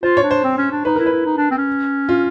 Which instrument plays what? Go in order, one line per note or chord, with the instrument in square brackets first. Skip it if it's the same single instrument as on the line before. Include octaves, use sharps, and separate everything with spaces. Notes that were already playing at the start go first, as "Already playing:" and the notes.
[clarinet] F4 [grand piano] C5
[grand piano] C#5
[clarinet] D4
[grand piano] C5
[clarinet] C4
C#4
D4
[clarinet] D#4 [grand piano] B4
[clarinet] E4 [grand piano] A#4
[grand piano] B4
[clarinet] E4
D#4
D4
C4
C#4
[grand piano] F4